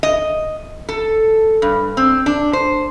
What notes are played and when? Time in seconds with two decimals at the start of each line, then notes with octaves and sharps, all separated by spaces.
0.03 D#5
0.89 A4
1.62 G2
1.97 C4
2.26 D4
2.53 C5